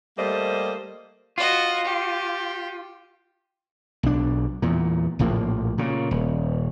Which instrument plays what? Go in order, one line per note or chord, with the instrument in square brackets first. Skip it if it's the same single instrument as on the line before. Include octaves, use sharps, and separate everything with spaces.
[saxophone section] G3 A3 A#3 C5 D#5
[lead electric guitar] F4 [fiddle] F#4 D#5
[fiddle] G4
[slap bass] B1 D4
E2 A#2
A#1 A2 F3 A#3
A#2 C#3
D#1